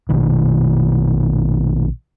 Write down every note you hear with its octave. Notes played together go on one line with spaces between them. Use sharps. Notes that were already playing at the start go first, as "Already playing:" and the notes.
A#1 B2 D#3